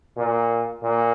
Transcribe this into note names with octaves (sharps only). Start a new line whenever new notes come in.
A#2
A#2